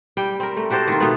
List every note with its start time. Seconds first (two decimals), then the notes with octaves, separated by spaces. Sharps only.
0.17 G3 G5
0.40 C4 A#4
0.57 A3
0.70 F#4 G4 A4 C5
0.87 D#3 F4
1.00 B2 A3 B3